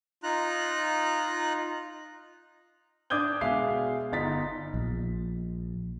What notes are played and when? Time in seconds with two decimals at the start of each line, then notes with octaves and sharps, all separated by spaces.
0.23 D#4 F4 A#5 F#6
3.10 D4 D6 D#6 G6 G#6 G7
3.41 B2 G#3 E5 F5 C7
4.12 G1 D#4 A6 B6
4.74 A#1